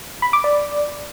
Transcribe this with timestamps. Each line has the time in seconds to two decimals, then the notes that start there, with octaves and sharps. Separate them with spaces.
0.22 B5
0.33 D6
0.44 D5